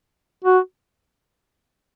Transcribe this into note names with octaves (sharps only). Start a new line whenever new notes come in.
F#4